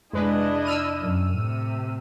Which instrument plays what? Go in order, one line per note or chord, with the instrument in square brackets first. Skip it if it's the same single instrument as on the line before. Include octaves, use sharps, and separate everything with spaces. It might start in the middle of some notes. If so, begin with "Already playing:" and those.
[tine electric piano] F2 C3 [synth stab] G#3 B4 [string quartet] D4 E4 D#5
[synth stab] E6 F6 D#7
[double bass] F#2
[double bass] A2 [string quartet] C3